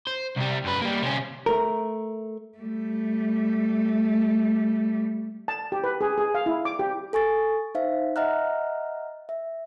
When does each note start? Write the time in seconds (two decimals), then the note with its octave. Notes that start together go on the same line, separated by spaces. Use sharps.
0.07 C5
0.36 C2 G3
0.64 F#2 B4
0.81 G3 A#3
1.02 C3 C#4
1.46 A3 A#4
2.58 G3 A3
5.48 A5
5.72 G4
5.84 B4
6.01 G#4
6.18 G#4
6.34 F5
6.46 E4
6.65 D6
6.79 G4
7.13 A4 G#5 C#6 A6
7.75 D#4 C5 E5 F5
8.16 D#5 E5 F#5 A#5 F6 F#6
9.29 E5